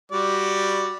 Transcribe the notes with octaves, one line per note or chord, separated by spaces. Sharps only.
G3 F#4 D5